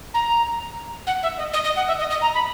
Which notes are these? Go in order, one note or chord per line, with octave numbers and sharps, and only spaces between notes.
A#5
F#5
E5
D#5
D#5
D#5
F#5
E5
D#5
D#5
A#5
B5